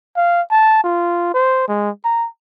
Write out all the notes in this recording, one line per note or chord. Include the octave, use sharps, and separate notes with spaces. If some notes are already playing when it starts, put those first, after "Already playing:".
F5
A5
F4
C5
G#3
A#5